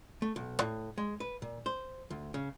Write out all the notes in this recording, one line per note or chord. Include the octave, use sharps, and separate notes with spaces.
A3
B1
A2
G#3
B4
A#2
C5
D2
C#3